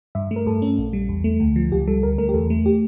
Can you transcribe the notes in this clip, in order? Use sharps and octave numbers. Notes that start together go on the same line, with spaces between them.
G2 E5
A3
A#4
G2 A4
C#4
A#1
G3
E2
A3
D2
F3
C#2 G4
G3 A4
D2 A#4
A3 A#4
G4
E2 A4
A3
G4